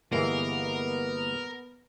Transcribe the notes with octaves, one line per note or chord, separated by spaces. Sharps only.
G1 E3 G#3 A#3 B3 A#4